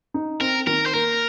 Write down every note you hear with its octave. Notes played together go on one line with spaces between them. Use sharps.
D#4
C4 A#4
D#3 A#4
C5
A#3 A#4